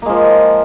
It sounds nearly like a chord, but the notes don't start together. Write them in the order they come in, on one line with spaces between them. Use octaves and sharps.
A#3 G#3 F3